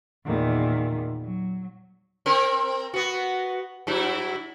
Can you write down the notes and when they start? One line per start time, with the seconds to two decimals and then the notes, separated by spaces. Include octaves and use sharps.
0.24 E2 A#2 D#3
1.22 F#3
2.26 C4 A#4
2.94 B3 F#4
3.87 G2 F#3 E4